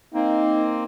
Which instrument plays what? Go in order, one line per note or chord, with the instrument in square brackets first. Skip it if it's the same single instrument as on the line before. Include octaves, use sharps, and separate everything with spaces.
[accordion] A#3 C4 [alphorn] D#4